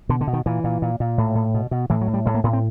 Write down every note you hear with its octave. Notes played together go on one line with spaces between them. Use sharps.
B2 D3
D3
B2
D#3
A#2 E3
A#2
A#2
A#2
A2
A2
B2
B2
A2 E3
F#3
A2
G3
A2 G#3
A#3
A2 B3
C4